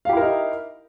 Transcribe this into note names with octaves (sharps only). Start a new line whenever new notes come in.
D#4 E4 G4 A#4 F5